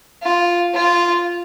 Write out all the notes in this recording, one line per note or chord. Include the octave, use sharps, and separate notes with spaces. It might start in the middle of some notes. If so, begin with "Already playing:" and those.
F4
F4